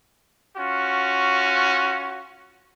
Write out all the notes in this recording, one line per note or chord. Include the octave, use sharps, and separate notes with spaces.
C#4 F4 F#4